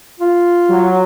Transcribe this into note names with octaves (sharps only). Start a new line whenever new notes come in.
F4
F#3